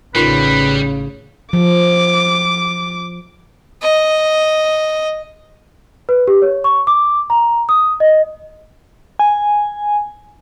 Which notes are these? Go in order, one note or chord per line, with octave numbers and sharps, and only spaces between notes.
A1 C#3 G3 D#4 F4 A#4 B4
F3 D6
D#5
B4
G4
C#5
C#6
D6
A#5
D#6
D#5
G#5